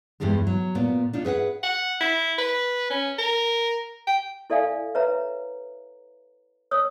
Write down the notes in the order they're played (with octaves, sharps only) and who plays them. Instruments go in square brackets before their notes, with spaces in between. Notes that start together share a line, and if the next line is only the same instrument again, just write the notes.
[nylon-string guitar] E2 G2 E3 G3 G#3
F#3
A#2 B3
D4 D#4 F4
G#4 B4 E5 F#5
[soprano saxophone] F#5
E4
B4
C#4
A#4
G5
[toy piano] E4 A4 D5 E5 F5 G#5
B4 C#5 E5 A#5
C#5 D#6 E6